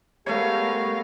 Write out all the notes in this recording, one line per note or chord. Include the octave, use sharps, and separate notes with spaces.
G#3 A3 B3 G4 A#4 C#5 F5